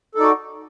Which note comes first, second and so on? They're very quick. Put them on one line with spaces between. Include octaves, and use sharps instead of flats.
A4 D#4 D5 F#4